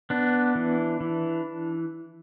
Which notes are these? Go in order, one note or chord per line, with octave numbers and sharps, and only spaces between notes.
B3 D4
E3
E3